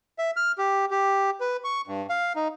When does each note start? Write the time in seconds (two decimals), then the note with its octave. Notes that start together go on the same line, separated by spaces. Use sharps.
0.19 E5
0.37 F6
0.58 G4
0.91 G4
1.41 B4
1.64 C#6
1.87 G2
2.10 F5
2.36 D#4